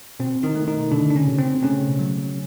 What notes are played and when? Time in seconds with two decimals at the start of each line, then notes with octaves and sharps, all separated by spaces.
0.20 B2 C4
0.43 D#3 D#4
0.55 A3
0.67 D#3 D#4
0.91 B2 D3 D4
1.10 D4
1.15 C#3 C#4
1.27 B2
1.39 C4
1.63 C#3 A3 C#4
1.99 F#3